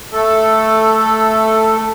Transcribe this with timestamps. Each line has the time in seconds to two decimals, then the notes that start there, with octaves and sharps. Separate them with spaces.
0.13 A3 A4